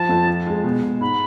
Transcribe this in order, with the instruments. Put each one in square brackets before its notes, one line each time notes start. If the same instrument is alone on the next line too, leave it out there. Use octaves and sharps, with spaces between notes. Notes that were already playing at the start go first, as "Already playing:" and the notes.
Already playing: [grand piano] F3 [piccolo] A5
[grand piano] F2
F3
G#3
B2
B2
[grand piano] G#2 [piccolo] B5